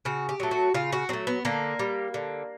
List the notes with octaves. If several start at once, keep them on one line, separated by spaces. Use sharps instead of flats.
C#3 F#4
G4
F#3 A3
F#4
C#3 F4
F#4
F#3 A3 C4
B3
D3 A#3
G3
D3